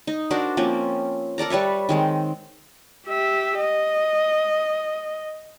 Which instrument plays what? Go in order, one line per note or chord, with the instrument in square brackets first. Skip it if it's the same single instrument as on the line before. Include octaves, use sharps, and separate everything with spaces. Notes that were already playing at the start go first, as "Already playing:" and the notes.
[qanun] D#4
D4 F#4 A#4 C5
F3 A#3 C4 C#4
A4 A#4 D5 A#5
G3 B4 C#5 E5
D#3 G#3 C4
[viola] G4 E5
D#5